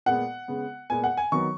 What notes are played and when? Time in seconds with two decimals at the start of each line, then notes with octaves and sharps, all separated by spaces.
0.06 A#2 G#3 B3 F#5
0.48 C#3 G#3 B3
0.90 A#2 G#3 B3 G#5
1.04 F#5
1.17 G#5
1.32 D#3 F#3 B3 C#6